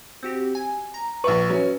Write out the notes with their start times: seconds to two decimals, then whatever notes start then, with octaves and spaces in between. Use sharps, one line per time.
0.23 C4 F#4 G4
0.55 G#5
0.94 A#5
1.24 A#1 B4 E5 C#6
1.50 F#3 C#4